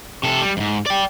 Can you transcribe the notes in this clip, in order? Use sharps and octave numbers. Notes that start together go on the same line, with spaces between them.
C3 A4
G3
F2 G#2
D5 G5